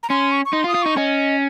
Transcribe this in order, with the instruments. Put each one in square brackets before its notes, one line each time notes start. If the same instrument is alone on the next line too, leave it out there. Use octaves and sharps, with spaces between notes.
[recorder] A#5
[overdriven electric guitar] C#4 [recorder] C6
[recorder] C#6
C#6
[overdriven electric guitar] D#4 [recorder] C6
[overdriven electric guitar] F4
[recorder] D#6
[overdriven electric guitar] F4
[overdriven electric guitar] D#4 [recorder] C#6
[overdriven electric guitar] C#4 [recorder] D#5